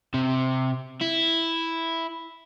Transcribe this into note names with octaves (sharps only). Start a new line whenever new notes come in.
C3
E4